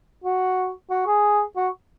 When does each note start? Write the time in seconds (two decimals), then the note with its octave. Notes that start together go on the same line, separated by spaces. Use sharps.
0.24 F#4
0.90 F#4
1.07 G#4
1.57 F#4